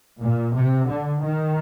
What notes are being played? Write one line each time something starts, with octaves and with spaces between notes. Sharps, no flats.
A#2
C3
D3
D#3